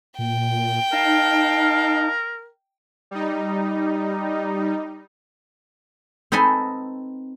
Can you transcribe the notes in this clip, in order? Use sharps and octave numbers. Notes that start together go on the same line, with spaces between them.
A#2 G5
D#4 A#4 F5 A5
G3 D#4
C4 D#4 A4 B4 D#5 G#5